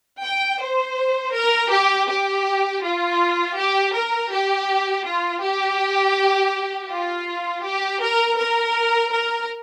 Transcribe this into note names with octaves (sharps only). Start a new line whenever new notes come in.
G5
C5
A#4
G4
G4
F4
G4
A#4
G4
F4
G4
F4
G4
A#4
A#4
A#4